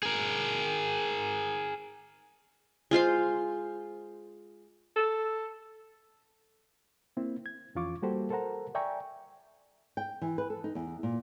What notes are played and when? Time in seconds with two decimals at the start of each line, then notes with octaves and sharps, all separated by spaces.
0.03 G#4 A#4
2.91 G#3 F4 C5 F5
4.96 A4
7.17 A#3 C4 E4
7.46 G#6
7.75 F2 E3 C#4 F4 C#6 D6
8.02 G3 A#3 F#4 G4 A4 C5
8.30 A4 A#4 C5 F#5 A#5
8.75 D5 E5 G5 G#5 A#5 C#6
9.97 G5
10.22 E3
10.38 B4
10.50 A4
10.64 D#4
10.75 E2
11.03 A#2